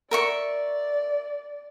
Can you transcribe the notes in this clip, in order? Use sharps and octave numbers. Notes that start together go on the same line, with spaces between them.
A#4 D5 E5 C#6